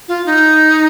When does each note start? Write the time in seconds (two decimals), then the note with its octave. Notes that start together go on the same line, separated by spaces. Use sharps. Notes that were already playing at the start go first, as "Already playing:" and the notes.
0.08 F4
0.26 D#4